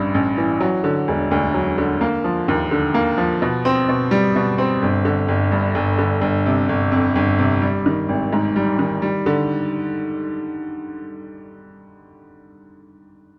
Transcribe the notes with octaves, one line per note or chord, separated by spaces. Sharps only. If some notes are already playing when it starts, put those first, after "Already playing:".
Already playing: A1 G2
A1
E3
F#3
D3
E1
D2
F#3
D3
A#3
F3
D#2
D3
A#3
F3
B2
C4
B2
G3
B2
C4
G1
D3
G1
G2
G1
D3
G1
C3
G1
F2
G1
C3
G3
D#3
G#1
G#2
G3
D#3
G3
D3